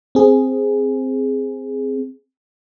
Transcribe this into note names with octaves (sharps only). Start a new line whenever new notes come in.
C4 G#4